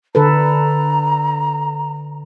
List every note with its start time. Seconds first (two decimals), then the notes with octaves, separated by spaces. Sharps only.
0.15 D3 A4 B4 A#5